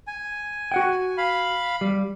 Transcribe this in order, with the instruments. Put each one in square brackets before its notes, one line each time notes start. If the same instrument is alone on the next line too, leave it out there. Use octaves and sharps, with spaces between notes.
[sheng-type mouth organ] G#5
[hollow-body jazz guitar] F#4 F#5 G5
[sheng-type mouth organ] F5 B5
[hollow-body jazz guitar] G3